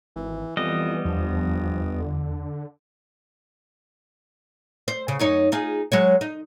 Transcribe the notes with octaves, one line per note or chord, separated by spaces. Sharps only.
G#1 E3
F2 E3 G3 B3 D#5
G1 E2 F3
D3
C5
C#3
F#2 D#4 C#5
D#4 F4 G#4
F#3 G#3 C#5
D#4